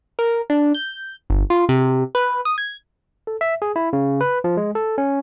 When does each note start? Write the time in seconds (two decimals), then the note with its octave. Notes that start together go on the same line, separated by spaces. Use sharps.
0.19 A#4
0.50 D4
0.75 G6
1.30 G1
1.50 F4
1.69 C3
2.15 B4
2.45 D#6
2.58 G#6
3.27 A4
3.41 E5
3.62 G#4
3.76 E4
3.93 C#3
4.21 B4
4.44 F3
4.57 G#3
4.75 A4
4.98 C#4